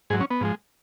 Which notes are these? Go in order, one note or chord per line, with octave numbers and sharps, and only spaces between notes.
G#2 F#3 G#4
C#4
B3
G#2 F3 G#3